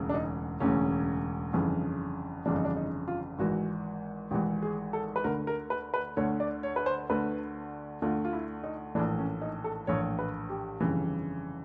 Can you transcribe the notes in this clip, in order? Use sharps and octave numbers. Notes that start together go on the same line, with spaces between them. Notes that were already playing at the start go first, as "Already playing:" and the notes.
Already playing: E1 D2 C#3 E3
D4
D#4
E1 D2 C#3 E3 C#4
G1 F2 C#3 E3
G1 F2 C#3 E3 D4
D#4
D4
D#4
F4
G#1 G#2 E3 F#4
G#1 G#2 E3 G4
G#4
A4
B4
D2 D3 A#4
A#4
B4
B4
D2 D3 C#5
D5
C#5
B4
C5
D2 D3 B4
D2 D3 F4
F4
E4
D#4
A#1 A2 E3 D4
C#4
D#4
A4
A#1 A2 E3 C#5
B4
G4
G1 F2 C#3 E3